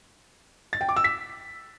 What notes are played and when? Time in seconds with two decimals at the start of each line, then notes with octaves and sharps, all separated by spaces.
0.73 A6
0.81 G5
0.89 D6
0.96 E6
1.04 B6